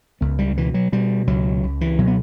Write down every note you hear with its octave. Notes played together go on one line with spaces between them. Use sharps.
C#2 B3
G3
B2 E3
F#3
B2 G3
C#2 F#3
C#2
E3
B2 F#3
B3